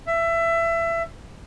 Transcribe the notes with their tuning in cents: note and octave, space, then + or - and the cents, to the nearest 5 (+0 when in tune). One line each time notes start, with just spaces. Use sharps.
E5 +20